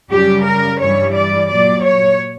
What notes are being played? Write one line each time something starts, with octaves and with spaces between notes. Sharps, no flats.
F#2 C#3 G3 G4
A#4
G2 E3 G3 C#5
D5
A#2 F#3 D5
C#5